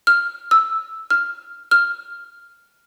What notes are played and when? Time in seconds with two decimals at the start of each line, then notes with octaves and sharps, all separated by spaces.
0.07 F6
0.51 E6
1.10 F6
1.71 F6